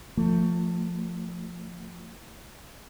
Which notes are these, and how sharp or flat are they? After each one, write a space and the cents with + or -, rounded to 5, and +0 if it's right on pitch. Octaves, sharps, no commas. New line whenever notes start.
F3 +0 A3 +25